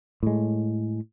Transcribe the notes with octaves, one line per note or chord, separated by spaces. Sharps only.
A2 G#3